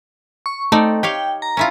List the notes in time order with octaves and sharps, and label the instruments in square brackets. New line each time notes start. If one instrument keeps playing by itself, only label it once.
[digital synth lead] C#6
[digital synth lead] A3 [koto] C4 D#4 D5
[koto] G4 C#5 F5 [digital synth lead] G5
[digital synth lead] A#5
[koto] C#4 E4 F4